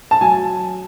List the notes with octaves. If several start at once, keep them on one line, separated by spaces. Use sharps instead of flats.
A5
F#3 G#5